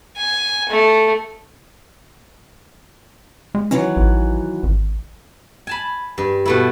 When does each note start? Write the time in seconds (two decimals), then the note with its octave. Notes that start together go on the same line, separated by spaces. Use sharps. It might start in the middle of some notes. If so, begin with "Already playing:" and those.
0.17 G#5
0.69 A3
3.55 G#3
3.71 D#3 E3 F#3 C#4
3.97 A1
4.63 G#1
5.67 G#5 A5 B5
6.18 G2
6.45 B2 A3 E4